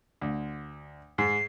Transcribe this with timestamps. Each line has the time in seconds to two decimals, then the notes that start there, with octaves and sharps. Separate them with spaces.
0.22 D2
1.18 G#2 C7